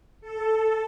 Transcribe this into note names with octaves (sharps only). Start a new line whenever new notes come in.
A4